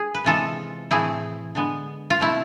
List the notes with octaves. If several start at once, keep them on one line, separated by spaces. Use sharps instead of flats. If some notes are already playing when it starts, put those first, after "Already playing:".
Already playing: G#4
B4
C3 E3 G#3 B3 F4 A4
A2 E3 A3 C4 E4 G#4
D3 G#3 B3
F4
B2 A3 C4 E4